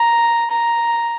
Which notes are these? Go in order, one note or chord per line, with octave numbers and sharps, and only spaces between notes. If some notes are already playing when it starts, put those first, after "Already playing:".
Already playing: A#5
A#5